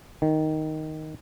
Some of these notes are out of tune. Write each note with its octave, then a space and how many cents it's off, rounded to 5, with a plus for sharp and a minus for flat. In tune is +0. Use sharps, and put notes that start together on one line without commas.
D#3 +0